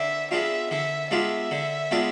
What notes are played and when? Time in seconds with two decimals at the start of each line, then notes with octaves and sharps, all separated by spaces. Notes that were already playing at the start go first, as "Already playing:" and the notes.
Already playing: D3 E5
0.31 G#3 B3 D4 F4 E5
0.71 D3 E5
1.11 G#3 B3 D4 F4 E5
1.51 D3
1.91 G#3 B3 D4 F4